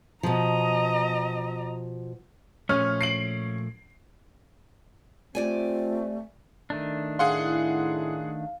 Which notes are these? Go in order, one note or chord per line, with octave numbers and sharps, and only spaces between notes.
B2 F3 D#5 A#5
A#2 F3 A3 C#4 F6
C7 D7 F#7
A3 C4 F4 G4 D5 G#5
D#3 A3 D4
A2 E4 G#4 F5 F#5 C6